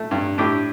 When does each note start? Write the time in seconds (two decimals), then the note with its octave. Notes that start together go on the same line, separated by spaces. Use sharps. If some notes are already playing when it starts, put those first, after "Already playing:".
Already playing: A3
0.11 G2
0.38 A2 D4 G4